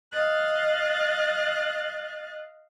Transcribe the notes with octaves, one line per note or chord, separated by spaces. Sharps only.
D#5 F5 F#6 A6